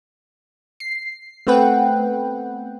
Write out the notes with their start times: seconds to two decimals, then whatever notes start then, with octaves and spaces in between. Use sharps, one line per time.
0.80 C7
1.47 A3 B3 C4 B4 F#5 G5